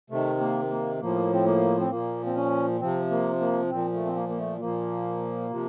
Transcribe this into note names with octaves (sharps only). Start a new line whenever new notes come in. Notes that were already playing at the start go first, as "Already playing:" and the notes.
C3 D#3 A3
A#3
A#3
A2 F3 A#3
C4
A#3
C4
A#2 F3 A#3
C4
C#4
C3 F3 C4
A#3
A#3
A#2 F3 C4
A3
C4
A#3
A#3
A3
A#2 F3 A#3
C3 F3